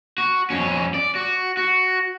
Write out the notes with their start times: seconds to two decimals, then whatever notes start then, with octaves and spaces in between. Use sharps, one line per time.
0.18 F#4
0.50 F2 C#4
0.94 D5
1.15 F#4
1.57 F#4